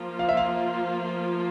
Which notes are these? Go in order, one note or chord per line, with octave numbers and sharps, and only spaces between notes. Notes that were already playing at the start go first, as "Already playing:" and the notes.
Already playing: F3 A#3 F4
F5
E5
F5